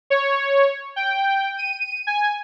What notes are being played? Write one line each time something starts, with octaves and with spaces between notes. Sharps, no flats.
C#5
G5
D#7
G#5